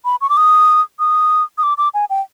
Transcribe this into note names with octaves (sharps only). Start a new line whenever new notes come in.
B5
C#6
D6
D#6
D#6
D#6
D6
D6
G#5
G5